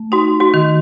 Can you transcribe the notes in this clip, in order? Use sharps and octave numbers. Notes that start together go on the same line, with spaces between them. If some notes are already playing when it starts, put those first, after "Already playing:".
Already playing: A3
D#4 F#4
F#4
D#3